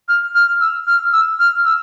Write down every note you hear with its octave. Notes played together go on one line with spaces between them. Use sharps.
F6
F6
E6
F6
E6
F6
E6